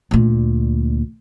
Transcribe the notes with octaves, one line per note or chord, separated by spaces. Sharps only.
D2 A#2